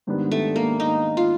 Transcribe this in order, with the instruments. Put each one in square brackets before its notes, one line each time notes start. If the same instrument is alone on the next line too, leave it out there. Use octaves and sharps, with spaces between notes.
[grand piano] G#2 D#3 G3 B3 D4
[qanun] A3
A#3
D#4
F4